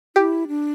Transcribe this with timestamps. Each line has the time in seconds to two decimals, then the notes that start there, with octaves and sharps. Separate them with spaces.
0.16 E4 G4
0.48 D4